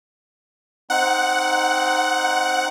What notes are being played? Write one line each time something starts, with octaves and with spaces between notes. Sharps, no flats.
C4 D#4 F#5